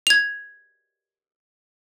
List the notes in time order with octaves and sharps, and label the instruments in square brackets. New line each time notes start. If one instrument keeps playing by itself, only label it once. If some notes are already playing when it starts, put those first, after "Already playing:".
[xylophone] G#6 F7